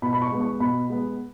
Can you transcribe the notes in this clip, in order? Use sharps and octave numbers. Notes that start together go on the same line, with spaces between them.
B2 B5
B5
C#6
G#3 B3
C#6
B2 B5
G#3 B3